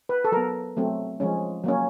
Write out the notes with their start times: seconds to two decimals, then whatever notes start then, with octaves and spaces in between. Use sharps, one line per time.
0.09 B4
0.24 A4
0.32 F#3 B3 A#4
0.77 F#3 A3 C4
1.20 F3 G#3 C#4
1.64 F#3 A#3 C#4